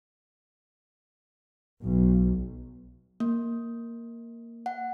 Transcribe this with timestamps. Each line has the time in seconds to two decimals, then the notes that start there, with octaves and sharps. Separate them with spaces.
1.83 B1
3.20 A#3
4.66 F#5